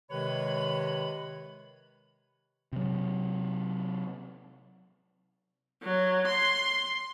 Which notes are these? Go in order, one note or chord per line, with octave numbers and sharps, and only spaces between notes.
C3 D#3 G#3 B4 C#5 B5
C3 F#3
F#3
C6